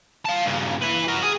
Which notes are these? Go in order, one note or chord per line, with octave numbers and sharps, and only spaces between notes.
F5 A5
G2 C#3
E4 B4
F#4 A#4
G#4